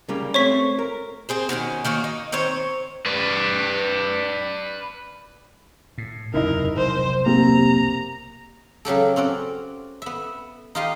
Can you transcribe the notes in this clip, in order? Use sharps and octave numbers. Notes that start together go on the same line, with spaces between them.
C#3 G3 A#3
A3 C4 C5 C#5 C#6 B6
A#4
C4 G#4 C5
B2 D#3 C4 C#4
D#3 A#3 C#4 F#4
D#4
D#3 C4 C5 C#5
B4 D5
A2
F#1 E2 C3 D#4 E4 A#4 D#5
F1 B1 C5
A#3 C4 G4 A#5
C#3 F#3 G4 A4
C4 C#4 F#4 D5
B3 E5
D#4 F4 G4 D#5 F5